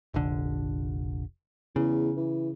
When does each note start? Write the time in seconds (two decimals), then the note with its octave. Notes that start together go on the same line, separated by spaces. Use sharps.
0.14 F1 A#1 D3
1.76 E2 C#3
2.16 E3